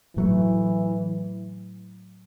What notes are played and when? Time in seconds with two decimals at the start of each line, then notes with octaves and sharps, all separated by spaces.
0.16 A2 E3 F#3 A3